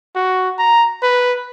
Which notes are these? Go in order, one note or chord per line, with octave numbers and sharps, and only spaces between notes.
F#4
A#5
B4